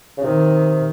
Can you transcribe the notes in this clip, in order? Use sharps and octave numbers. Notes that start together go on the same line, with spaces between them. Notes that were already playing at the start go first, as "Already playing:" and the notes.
C#3
C3 D#3